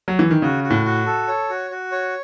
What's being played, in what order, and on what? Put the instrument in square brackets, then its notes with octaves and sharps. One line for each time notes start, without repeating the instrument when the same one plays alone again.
[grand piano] F#3
E3
D#3
[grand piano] C#3 [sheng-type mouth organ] F#4
[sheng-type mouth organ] F#4
[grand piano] A2
[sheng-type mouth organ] F#4
A4
C#5
F#4
F#4
C#5